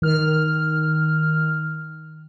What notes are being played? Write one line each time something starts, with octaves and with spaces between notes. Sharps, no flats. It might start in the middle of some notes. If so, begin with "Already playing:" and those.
D#3 F6